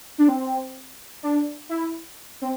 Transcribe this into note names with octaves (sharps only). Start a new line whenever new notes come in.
D4
C4
D4
E4
C4